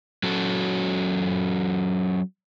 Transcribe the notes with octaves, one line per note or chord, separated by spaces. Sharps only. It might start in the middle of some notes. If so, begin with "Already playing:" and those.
F#3 C#4 F#4 A4